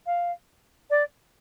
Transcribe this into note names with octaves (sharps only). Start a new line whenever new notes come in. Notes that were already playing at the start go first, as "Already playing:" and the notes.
F5
D5